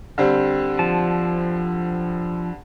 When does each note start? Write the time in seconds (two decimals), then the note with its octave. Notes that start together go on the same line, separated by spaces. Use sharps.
0.18 D3 G3 C4
0.79 F3 A5